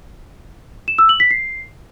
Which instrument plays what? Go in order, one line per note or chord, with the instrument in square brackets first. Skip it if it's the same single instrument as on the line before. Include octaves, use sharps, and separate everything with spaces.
[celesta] E7
E6
F#7
B6
C7